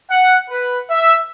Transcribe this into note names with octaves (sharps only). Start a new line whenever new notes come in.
F#5
B4
E5